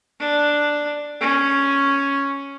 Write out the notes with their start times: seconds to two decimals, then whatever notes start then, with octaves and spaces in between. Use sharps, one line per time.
0.20 D4
1.20 C#4